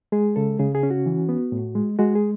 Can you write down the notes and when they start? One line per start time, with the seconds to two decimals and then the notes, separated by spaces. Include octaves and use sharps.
0.12 G#3 G#4
0.36 C#3 A4
0.59 C#3 G#4
0.75 G#4
0.83 C#4
0.90 F#4
1.06 E3
1.29 B3
1.52 A2
1.75 G#3
1.99 G#3 F#4
2.15 G#4